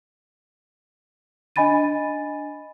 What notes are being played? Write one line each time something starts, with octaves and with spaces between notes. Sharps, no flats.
D4 D#5 G#5 B5 A6 D#7